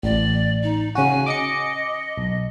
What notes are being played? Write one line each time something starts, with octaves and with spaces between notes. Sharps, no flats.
A1 D5
D#4
C#3 F#4 G#5
D#5 D6 D#6 C#7
B1